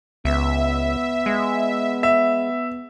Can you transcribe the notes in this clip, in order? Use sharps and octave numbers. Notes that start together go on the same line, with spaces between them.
C#2 B3 E5
G#3
E5